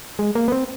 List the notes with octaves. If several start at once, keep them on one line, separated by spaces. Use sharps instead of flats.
G#3
A#3
B3
C4